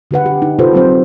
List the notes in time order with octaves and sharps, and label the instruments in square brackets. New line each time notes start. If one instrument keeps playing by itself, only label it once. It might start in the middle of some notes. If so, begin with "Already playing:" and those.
[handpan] D3 G4 B4 F#5
G4
D#4
C3 F4 G4 A4 B4 C5
F#3 C4 C5